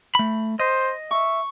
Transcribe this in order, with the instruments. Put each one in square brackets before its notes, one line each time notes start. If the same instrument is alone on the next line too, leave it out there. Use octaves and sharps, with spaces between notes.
[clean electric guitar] A3 B5
[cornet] C5 [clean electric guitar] D#5
[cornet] E5 [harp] C#6